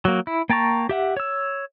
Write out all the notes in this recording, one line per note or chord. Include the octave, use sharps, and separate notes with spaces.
F#3 A#3
E4
A#3 G5 A5 A#5 C#6
G4 E5 F#5
C#5 E6